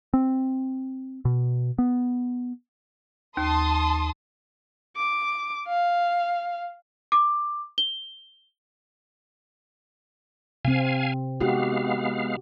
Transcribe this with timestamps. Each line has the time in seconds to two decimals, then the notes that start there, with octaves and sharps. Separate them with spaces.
0.14 C4
1.25 B2
1.79 B3
3.37 D#2 A5 C6 D#6
4.97 D6
5.68 F5
7.12 D6
7.78 G7
10.65 C3 C4 F5 G#5
11.40 G#3 B3 D#4 F#4 G4 F5